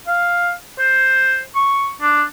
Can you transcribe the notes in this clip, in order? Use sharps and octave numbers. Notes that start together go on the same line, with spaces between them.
F5
C5
C#6
D4